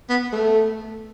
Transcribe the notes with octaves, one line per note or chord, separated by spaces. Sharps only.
B3
A3